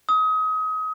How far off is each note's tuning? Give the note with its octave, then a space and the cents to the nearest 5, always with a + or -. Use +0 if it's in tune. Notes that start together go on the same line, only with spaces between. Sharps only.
D#6 +30